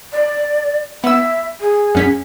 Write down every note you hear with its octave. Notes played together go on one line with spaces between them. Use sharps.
D5
B3 E5 E6
G#4
F#2 C#4 B6